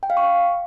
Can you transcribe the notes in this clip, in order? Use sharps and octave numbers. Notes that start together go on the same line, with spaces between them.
G5
F5
C#6